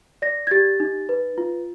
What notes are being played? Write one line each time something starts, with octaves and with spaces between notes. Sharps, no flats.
D5 A#6
G#6
G4 A6
D#4
B4
F4